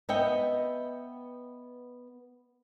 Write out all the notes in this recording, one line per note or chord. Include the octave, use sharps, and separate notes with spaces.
B3 B4 D#5 E5 F#5 G5